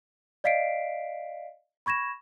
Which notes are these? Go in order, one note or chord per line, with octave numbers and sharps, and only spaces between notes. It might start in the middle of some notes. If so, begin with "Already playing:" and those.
D5 D#5 F5 B6 C7 D7
B5 C#6 G#6 A#6 E7